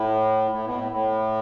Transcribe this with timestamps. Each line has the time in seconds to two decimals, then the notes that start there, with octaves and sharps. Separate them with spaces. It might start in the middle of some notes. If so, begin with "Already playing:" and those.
Already playing: A2
0.51 A2
0.65 B2
0.78 A2
0.92 A2